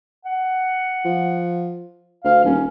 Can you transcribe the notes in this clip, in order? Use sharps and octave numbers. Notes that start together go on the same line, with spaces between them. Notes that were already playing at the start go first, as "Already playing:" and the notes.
F#5
F3
D2 F5
D#1 C#4